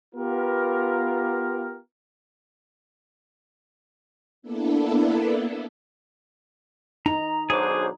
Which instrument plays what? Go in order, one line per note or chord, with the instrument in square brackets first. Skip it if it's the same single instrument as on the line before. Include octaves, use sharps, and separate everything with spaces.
[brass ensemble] B3 F4 G4 A#4
[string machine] A#3 B3 D4 E4 A4
[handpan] D#4 [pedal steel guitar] A#5
[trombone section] B1 F#3 D4 [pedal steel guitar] G#4 D6 [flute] C5